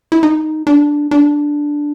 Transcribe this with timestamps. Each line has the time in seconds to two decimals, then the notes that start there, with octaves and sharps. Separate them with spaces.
0.12 E4
0.23 D#4
0.67 D4
1.11 D4